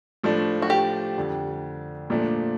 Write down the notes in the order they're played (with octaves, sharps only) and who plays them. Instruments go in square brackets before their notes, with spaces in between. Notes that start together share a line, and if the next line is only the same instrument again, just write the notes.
[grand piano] A2 F3 A3 D4
[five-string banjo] F#4
G4
[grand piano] F2 D3 G3
A#2 F3 A3 D4